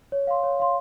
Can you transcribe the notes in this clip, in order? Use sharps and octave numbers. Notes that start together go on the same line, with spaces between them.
C#5
F5 C6
C#5
F5 C6